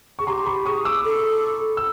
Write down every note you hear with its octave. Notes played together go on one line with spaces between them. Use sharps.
G#4 C#6
G4 A#5 C6
B5 C#6
G#4 C#6 D#6
D6 E6
A4
E6